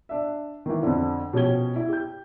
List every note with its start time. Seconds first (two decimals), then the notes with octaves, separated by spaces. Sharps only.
0.09 D4 E5
0.66 D#3 E3
0.83 F2 D3
1.33 B2 F3 C#4 G4 G#6 G7
1.76 E4
1.89 G4 G6